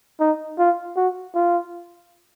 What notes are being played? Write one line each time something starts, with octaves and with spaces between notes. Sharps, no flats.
D#4
F4
F#4
F4